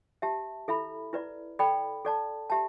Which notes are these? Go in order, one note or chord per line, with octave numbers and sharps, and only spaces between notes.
G4 E5 A5
E4 A4 E5 B5
E4 B4 D5
A4 D5 G5 B5
A4 D5 A5
G4 E5 A5